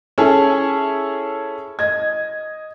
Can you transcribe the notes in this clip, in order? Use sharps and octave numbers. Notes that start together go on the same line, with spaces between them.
C#4 E4 G#4 A4
D#5 G#6